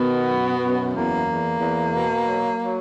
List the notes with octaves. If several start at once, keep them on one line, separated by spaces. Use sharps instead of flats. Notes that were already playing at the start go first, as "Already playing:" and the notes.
Already playing: B2 D#3 B3
F#2
F#2
E2 A#3
E2
E2
B2
F#3
F#3